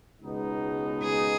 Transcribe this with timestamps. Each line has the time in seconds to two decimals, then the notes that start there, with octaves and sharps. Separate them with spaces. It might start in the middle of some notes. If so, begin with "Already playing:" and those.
0.21 C#2 B2 G#3 B3 D#4
1.03 G#4